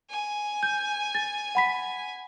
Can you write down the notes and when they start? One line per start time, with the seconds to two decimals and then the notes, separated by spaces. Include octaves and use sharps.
0.10 G#5
0.63 G6
1.15 A6
1.55 F#5 B5 B6